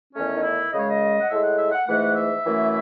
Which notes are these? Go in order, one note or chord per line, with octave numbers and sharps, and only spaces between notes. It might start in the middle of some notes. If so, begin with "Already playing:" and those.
E2 D#3 A3 C#4
D#4
E4
F#2 C#3 G#3 D#5
C#5
D#5
F#5
A2 G#3 E5
F#5
E5
F#5
G#2 E3 A3 F#5
E5
F#2 E3 A3